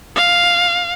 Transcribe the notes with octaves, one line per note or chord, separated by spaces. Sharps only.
F5